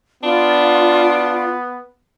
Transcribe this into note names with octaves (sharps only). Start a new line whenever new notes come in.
B3 D4 F4